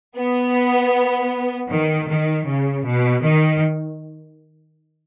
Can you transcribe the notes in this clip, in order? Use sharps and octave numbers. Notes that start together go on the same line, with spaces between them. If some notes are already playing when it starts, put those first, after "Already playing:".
B3
D#3
D#3
C#3
B2
D#3